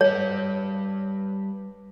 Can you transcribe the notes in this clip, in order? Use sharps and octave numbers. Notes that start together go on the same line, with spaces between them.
G3 B4 C#5